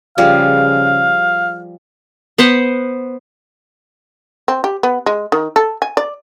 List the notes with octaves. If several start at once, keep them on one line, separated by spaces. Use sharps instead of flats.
C#3 F3 G3 G#4 F5
B3 B4 C5 F#5
C4
G4
B3
G#3
D#3
A4
G#5
D5